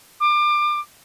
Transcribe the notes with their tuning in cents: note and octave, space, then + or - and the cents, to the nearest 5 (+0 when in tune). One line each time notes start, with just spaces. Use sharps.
D6 +30